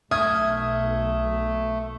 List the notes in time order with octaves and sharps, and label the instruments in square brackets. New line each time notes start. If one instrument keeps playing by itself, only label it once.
[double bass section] B1 [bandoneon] A3 [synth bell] E5 F6 G#6 [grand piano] D#6